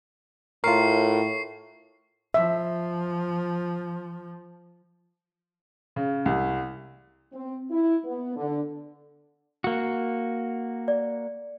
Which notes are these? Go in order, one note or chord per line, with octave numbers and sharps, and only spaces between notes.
A2 F4 A#4 C#6 C7
F3 E5
C#3
C2
C4
E4
B3
D3
A#3 F#4
D5